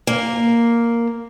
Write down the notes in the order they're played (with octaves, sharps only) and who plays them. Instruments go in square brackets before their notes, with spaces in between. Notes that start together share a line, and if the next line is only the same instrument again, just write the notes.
[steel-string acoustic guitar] A#3